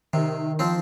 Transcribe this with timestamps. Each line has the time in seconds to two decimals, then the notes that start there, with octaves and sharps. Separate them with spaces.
0.13 C3 D#3
0.59 F3 C4